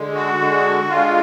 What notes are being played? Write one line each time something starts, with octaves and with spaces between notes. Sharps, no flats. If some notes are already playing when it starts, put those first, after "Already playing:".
Already playing: D3 G#3
F#4
D3 G#3
D3 G#3 F4